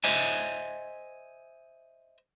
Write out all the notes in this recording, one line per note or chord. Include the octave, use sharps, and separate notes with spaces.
C5 D#5 E5 G#5